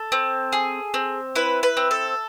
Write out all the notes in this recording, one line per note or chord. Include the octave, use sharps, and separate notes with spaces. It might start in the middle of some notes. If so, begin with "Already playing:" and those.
Already playing: A4
C4
G#4
C4
E4 B4
B4
C4
A4